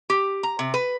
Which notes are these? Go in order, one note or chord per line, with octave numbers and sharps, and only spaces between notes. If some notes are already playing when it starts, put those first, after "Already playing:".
G4
A#5
C3
B4